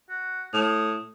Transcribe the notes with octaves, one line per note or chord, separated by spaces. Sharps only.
F#4
A2 D#6